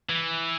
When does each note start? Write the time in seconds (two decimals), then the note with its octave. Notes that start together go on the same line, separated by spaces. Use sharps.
0.09 E3